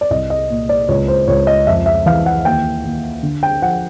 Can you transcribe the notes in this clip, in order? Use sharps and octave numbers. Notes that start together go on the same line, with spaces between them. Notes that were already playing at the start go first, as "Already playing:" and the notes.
D5
C2 D#5
D#5
A#2
D5
C#2 C#5
C5
C#2 C#5
D#5
F2 E5
E5
E3 F5
F#5
D#2 G5
D#2
D3
G5
F3 F#5